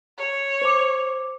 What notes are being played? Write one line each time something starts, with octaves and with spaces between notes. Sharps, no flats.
C#5
C5 D6